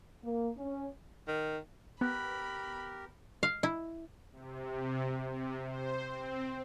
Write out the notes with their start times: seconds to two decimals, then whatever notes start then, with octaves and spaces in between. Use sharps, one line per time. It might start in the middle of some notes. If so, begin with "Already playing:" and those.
0.24 A#3
0.58 C#4
1.28 D#3
2.01 B3 G4 A#4 B5 F#6
3.43 F5
3.63 E4
4.32 C3
5.30 C3
5.65 C5
6.05 C4